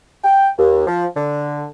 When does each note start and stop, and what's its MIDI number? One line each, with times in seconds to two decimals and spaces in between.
0.23 0.49 79
0.58 0.82 39
0.87 1.05 53
1.16 1.66 50